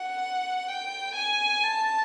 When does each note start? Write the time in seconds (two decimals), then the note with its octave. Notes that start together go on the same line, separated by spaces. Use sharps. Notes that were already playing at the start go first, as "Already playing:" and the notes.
Already playing: F#5
0.68 G5
1.15 G#5
1.63 A5